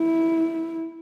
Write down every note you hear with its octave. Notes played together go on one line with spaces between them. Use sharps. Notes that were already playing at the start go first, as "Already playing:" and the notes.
Already playing: E4